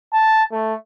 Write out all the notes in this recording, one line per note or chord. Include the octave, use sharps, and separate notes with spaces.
A5
A3